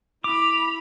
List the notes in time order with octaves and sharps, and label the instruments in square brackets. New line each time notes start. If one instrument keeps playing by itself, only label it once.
[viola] E4 B5 [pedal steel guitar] D6 [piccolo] F7